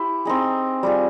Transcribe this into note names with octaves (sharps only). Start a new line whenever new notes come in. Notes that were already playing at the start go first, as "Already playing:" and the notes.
Already playing: E4 G4 C5
C4 D#4 G#4
G3 C4 F4 G#4